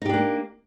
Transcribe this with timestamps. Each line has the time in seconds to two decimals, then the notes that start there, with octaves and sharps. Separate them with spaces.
0.02 D#4
0.06 G4
0.10 D4
0.13 A#3